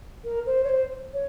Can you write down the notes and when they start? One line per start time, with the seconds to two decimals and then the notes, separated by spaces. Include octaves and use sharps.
0.24 A#4
0.46 C5
0.64 C#5
0.69 C5
1.13 C#5